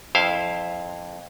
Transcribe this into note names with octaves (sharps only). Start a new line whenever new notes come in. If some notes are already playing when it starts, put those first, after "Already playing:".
F2 E4 C5 F5